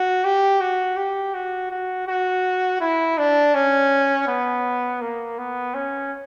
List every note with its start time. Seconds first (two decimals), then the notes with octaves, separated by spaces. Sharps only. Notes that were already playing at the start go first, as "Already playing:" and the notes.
Already playing: F#4
0.25 G4
0.61 F#4
0.97 G4
1.34 F#4
1.71 F#4
2.08 F#4
2.81 E4
3.18 D4
3.54 C#4
4.28 B3
5.01 A#3
5.38 B3
5.74 C#4